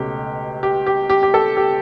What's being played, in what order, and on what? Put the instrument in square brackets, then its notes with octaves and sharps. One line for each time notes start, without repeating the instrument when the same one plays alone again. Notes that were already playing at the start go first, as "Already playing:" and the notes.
Already playing: [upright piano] C#2 B2 A3 C#4 G4
G4
G4
G4
G4
A4
G4